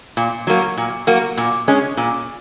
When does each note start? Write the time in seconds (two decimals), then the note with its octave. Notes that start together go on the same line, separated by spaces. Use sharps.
0.17 A#2
0.47 F#3 A#3 F#4
0.77 A#2
1.07 F#3 A#3 F#4
1.37 A#2
1.68 G#3 C#4
1.97 A#2